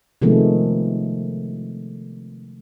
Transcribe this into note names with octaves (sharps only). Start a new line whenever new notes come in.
C3 D#3 F3 G#3 A3 B3